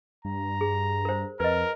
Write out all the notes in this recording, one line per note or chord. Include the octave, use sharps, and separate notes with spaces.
G2 A#5
G#4
A#4 C5
F2 A#4 B4 D#5